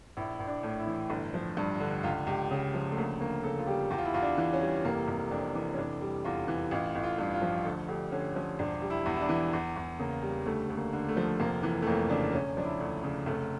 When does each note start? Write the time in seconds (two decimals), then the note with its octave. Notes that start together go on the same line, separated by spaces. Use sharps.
0.17 A#1 E4
0.39 A#1
0.48 D4
0.63 A2
0.79 E4
0.87 E3
1.10 G1
1.34 F3
1.57 G2
1.80 D3
2.03 C#2 F4
2.27 C#2 G4
2.51 C#3
2.74 F3
2.91 A3
2.97 D2 A#3
3.21 D2 A#3
3.44 C#3 A4
3.59 F4
3.67 G3 G4
3.90 E2 G4
3.98 F4
4.05 E4
4.14 E2 F4
4.22 D4
4.37 E3
4.53 C#4
4.61 G3
4.85 F1 A#3
5.08 F1
5.31 F2 D4
5.55 E3
5.74 C#4
5.78 F1 D4
6.01 G3
6.24 E2 F4
6.48 E3
6.71 A1 F4
6.95 A1
7.04 F4
7.18 G2
7.34 F4
7.42 F3
7.65 D2 A4
7.88 D2 G4
8.12 D3 C#4
8.36 F3 C#4
8.59 E1 D4
8.82 G3
8.90 E4
9.06 E2
9.16 E4
9.21 D4
9.29 E3
9.53 E2
9.76 E2
9.99 C#3 A#3
10.23 G3
10.46 D2 A3
10.69 D2
10.77 A#3
10.93 D3
11.08 A3
11.17 F3
11.40 F1 A#3
11.63 E3
11.82 A3
11.86 F2 A#3
12.09 C#3 D4
12.33 E1 C#4
12.57 F3 D4
12.65 E4
12.80 D2
13.03 C#3
13.26 F1 A3